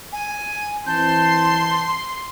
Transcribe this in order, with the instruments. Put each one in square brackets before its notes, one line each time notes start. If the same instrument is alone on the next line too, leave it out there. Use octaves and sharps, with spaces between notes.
[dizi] G#5
[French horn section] E3 C4 [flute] A5 [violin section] C6 [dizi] G6